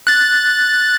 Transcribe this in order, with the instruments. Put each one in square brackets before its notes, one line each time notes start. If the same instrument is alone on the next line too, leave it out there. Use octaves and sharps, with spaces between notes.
[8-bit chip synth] F#6 A6